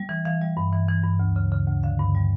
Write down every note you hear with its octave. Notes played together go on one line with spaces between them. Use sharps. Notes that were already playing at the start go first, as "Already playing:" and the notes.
Already playing: G3
E3
E3 F5
G3
G2
E3
E3
G2
D2
C#3
C#3
D2
D3 F5
G2
G3